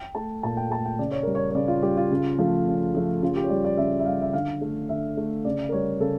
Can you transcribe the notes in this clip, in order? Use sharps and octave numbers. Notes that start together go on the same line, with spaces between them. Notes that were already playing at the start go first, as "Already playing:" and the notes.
Already playing: G5
A3 A5
A#2 A5
G5
A3 A5
G5
C#3 D5
C#5
G3 A#4
C#5
C#5
C#3 D5
F4
G3 G4
F4
C#3
F3 A3
C#3
F3 A3
C#3 F4
G4
C#5
G3 D5
D5
C#3 E5
E5
G3 F5
E5
D3 F5
A3
D3 E5
A3
C#3 D5
A#4
G3 C#5
C#3 A4